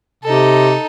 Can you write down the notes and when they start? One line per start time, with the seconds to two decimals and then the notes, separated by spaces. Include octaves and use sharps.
0.23 C3 D#4 A4